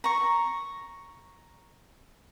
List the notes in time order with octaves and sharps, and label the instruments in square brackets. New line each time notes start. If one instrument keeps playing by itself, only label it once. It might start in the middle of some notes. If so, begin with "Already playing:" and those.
[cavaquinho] A#5 C#6